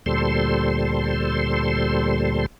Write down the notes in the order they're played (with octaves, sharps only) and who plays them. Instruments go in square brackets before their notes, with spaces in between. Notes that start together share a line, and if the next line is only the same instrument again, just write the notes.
[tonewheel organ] D2 A#2 G3 A4 C5 C6